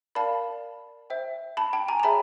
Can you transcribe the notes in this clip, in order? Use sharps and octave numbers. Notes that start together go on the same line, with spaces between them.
A#4 D5 F5 A5 B5
C5 E5 G5
A5 B5
G5 A5
G#5 A#5
A#5
G#4 C#5 E5 G5 A5 B5